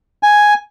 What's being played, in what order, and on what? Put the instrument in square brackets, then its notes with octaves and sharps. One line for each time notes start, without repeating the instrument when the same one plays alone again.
[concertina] G#5